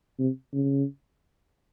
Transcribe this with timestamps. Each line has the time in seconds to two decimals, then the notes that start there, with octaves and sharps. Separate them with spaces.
0.19 C3
0.53 C#3